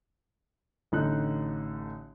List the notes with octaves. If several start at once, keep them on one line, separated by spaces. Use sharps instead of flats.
A1 D3 D#4 F#6